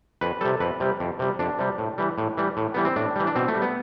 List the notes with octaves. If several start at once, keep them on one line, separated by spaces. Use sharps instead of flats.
F2 B4
C3 G3 A4
F2 B4
C3 G3
F2
C3 G3
F2 D4
C3 G3
A2
E3 G3
A2
E3 G3
A2
E3 G3 B3
C4
A2 D4
E3 G3
D4
B2 C4
A3
G3
B3